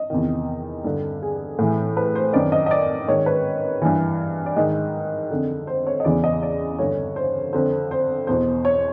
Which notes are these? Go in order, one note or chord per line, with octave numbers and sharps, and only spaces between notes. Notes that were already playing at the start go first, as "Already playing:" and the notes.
Already playing: D#5
E2 C3 D#3
G2 D3
G#4
A2 E3
B4
C5
F#2 D#3 D5
D#5
D#5
D5
G#2 D#3 C#5
B4
G2 E3
D5
G#2 D#3 D#5
F2 D3
C5
C#5
D#5
E2 C#3 E3 D5
D#5
D5
G2 D3 C#5
C5
F2 D3 C5
C5
E2 B2 C5
C#5